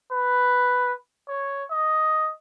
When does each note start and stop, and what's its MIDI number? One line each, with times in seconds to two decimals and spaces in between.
0.11 0.93 71
1.28 1.64 73
1.70 2.31 75